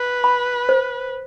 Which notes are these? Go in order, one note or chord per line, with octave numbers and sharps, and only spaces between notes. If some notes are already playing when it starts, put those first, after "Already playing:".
Already playing: B4
B5
C5